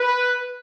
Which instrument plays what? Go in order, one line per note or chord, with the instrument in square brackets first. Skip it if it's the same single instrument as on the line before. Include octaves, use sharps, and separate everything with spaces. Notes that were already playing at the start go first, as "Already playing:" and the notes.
Already playing: [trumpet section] B4